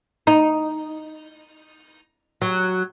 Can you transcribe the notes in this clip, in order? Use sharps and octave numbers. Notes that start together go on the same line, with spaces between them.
D#4
F#3